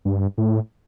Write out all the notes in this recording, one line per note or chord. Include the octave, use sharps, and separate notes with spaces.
G2
A2